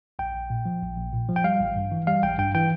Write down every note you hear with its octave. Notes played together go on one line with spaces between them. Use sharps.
A#1 G5
A#1
A#2
F3
A#1
A#1
A#2
F3
G5
G3 F5
A1
G2
E3
G3 F5
A1 G5
G2 G5
E3 G5